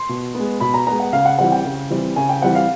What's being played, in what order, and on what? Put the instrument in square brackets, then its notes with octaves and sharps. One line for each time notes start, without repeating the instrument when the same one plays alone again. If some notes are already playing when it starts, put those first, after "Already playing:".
Already playing: [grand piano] C6
B2
G#3 B3
B2 B5
A#5
G#3 B3 A#5
F#5
C#3 F5
F#5
E3 G3 C4 F#5
G5
C#3
E3 G3 C4
C#3 G#5
G5
E3 G3 C4 F#5
F5